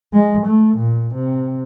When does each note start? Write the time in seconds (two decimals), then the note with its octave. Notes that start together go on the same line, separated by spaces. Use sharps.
0.13 G#3
0.46 A3
0.78 A#2
1.14 C3